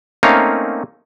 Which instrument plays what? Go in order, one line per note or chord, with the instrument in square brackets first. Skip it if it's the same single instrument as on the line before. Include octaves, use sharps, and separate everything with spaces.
[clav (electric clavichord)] A3 A#3 C4 C#4 D#4 F5